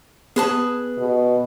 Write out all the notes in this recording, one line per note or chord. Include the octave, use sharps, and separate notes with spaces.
B3 G#4 B4 A5
B2